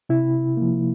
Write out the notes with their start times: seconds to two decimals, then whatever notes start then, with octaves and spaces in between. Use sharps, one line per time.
0.09 C3 E4
0.57 F3 A#3